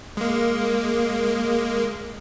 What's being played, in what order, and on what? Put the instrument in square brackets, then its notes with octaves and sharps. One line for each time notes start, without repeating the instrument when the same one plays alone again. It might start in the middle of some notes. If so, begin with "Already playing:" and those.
[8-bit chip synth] G#3 A#3